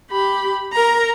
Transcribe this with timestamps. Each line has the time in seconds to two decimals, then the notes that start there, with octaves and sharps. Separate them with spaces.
0.11 G4 B5
0.73 A#4 A#5